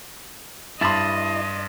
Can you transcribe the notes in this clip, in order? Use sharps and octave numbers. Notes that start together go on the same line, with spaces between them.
G2 E4 D#5 A5 B5 C6